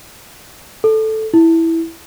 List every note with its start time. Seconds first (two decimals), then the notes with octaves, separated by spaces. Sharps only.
0.84 A4
1.34 E4